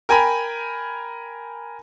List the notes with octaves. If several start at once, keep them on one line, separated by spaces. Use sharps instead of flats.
A#4 G5 G#5 A#5 B5